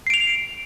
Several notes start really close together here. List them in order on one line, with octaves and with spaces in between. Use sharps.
C7 D7 F7